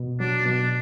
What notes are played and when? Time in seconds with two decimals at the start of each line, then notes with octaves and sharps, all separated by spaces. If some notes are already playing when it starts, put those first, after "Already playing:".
Already playing: B2
0.20 F#3 D4
0.46 B2 D4